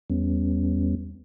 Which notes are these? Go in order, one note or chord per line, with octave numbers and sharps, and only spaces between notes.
E2 G3 B3 C#4